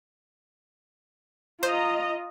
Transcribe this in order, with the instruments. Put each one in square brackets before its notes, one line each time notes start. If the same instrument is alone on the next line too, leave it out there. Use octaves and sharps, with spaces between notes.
[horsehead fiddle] F4 [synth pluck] C5 [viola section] D#5 A#5